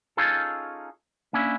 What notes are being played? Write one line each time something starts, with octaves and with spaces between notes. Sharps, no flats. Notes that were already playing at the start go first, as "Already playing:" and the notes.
C#4 D#4 F4 G#4 A4
A#3 C#4 D4 E4